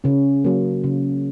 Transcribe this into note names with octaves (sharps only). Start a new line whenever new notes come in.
C#3 C#4
F#3 A#3
C#3